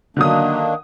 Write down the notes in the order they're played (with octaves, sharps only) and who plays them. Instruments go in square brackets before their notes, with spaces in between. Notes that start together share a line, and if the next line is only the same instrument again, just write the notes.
[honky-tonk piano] D3 F#3 D#6 [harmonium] D#3 A#3 D4